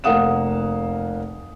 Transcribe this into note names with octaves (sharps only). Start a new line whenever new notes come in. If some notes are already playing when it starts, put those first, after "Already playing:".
F1 A#3 F5 F#5 D#6 E7